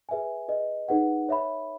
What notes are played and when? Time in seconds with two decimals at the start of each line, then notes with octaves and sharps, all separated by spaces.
0.09 G#4 B4 E5 G#5
0.48 G#4 B4 D#5
0.88 D#4 G#4 B4 F#5
1.29 C#5 E5 B5